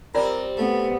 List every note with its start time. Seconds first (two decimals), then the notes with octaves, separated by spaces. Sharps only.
0.15 G3 C4 F4 A#4 C5 D5
0.58 A3 B3